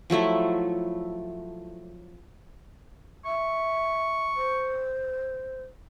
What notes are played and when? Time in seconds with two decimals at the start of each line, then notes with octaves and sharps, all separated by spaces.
0.10 F3 F#3 A3 E4
3.25 E5 C#6
4.36 C5